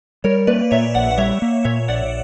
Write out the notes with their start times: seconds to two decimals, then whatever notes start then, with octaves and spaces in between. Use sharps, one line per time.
0.24 G3 A#4 C#5
0.47 A#3 B4 D5
0.71 A#2 C#5 E5
0.94 A#1 D5 F#5
1.11 F#5
1.18 G3 C#5 E5
1.42 A#3
1.65 A#2 C#5 E5
1.88 A#1 D5 F#5